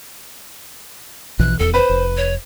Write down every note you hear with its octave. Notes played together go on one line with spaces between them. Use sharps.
A#1 B2 E3 F#6
D#1 E2 A4
B4 C5
F1
C#5